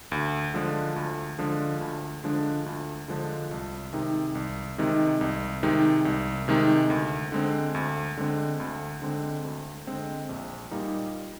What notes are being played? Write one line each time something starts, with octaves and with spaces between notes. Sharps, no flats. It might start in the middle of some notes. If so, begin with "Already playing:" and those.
D2
D3 F3 G#3 D4
D2
D3 F3 G#3 D4
D2
D3 F3 G#3 D4
D2
D3 F3 G#3 D4
C2
C3 D#3 G#3 D#4
C2
C3 D#3 G#3 D#4
C2
C3 D#3 G#3 D#4
C2
C3 D#3 G#3 D#4
D2
D3 G#3 C4
D2
D3 G#3 C4
D2
D3 G#3 C4
D2
D3 G#3 C4
A#1
A#2 G3 A#3 D#4